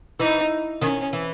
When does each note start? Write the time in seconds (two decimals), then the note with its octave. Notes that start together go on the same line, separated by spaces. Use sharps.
0.19 E3 D#4
0.81 D#3 C#4
1.13 E3